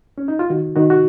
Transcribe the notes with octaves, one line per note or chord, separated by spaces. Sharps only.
C#4
D#4
F4
D#3 F#4
D#3 F#4
F#4